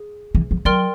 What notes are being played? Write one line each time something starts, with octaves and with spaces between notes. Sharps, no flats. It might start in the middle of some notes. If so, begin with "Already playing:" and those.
Already playing: G#4
E3
F3
F#3 A#4 D5 G5 C6 F6